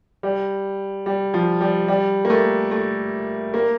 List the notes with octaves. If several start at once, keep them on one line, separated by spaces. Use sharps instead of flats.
G3
G3
F3
G3
G3
A#3
A3
A3
A#3